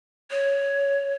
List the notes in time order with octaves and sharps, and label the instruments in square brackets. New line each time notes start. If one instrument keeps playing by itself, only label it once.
[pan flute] C#5